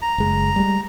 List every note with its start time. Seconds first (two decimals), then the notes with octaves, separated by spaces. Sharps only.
0.02 A#5
0.18 F#1 G#3
0.56 G3 G#3